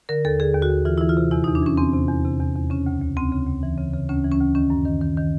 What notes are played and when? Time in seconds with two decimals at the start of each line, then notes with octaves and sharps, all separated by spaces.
0.09 D3 A#4
0.25 D#2 A4
0.40 D3 G#4
0.55 D#2
0.62 F#4
0.70 D#2
0.85 E3 F4
0.98 E3 E4
1.09 F4
1.17 C3
1.31 E2 E4
1.44 D#4
1.48 E2
1.55 D4
1.63 E3 C#4
1.77 E2 C4
1.93 C3
2.08 E2
2.25 C3
2.40 E2
2.56 E2
2.70 C#3 C#4
2.86 D2
3.01 D2
3.17 D2 C4
3.32 C#3
3.47 D2
3.63 E3
3.78 C#3
3.93 C#3
4.09 D2 C#4
4.24 E3
4.32 C#4
4.40 D2
4.55 D#3 C#4
4.70 F#2
4.85 D#3
5.01 D#3
5.17 D#3